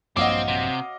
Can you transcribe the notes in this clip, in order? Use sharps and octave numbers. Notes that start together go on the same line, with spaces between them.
A#1 G2 A#2 F#3 C4 D#5 F5 D6
C3